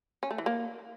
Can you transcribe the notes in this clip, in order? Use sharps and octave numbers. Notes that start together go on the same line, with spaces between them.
C#4
A3
E3
A#3